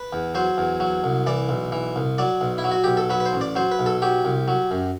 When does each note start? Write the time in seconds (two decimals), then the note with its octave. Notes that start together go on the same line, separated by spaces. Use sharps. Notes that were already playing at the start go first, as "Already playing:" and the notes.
Already playing: B4
0.13 E2
0.35 F#3 C5
0.58 E2
0.80 F#3
1.04 C2
1.26 E3 D5
1.49 B1
1.72 E3
1.96 C2
2.18 F#3 D5
2.41 B1
2.58 E4
2.64 F#3
2.71 F#4
2.84 B1 G4
2.97 A4
3.10 F#3 B4
3.20 B4
3.26 C5
3.33 A1
3.41 D5
3.55 F#3 C5
3.72 B4
3.79 B1
3.86 A4
4.02 F#3 G4
4.25 C2
4.48 F#3
4.71 F#2